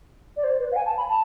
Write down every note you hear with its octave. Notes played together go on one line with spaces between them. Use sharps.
D5
C5
B4
F5
G#5
A5
B5
A5